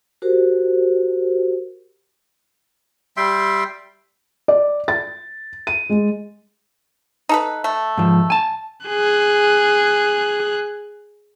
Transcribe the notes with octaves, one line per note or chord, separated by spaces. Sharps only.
F#4 G4 A#4 C5
G3 E5 G5 C6
D5
A6
D#7
G#3
D#4 A4 B4
A3
G#2 F3
G#5 A5
G#4 F#6